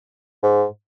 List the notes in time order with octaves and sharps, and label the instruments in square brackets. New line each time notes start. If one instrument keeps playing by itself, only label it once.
[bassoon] G#2